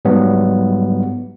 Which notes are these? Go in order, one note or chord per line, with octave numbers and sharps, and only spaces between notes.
G#2 F#3 G3 B3